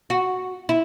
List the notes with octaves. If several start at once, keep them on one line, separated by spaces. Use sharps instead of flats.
F#4
E4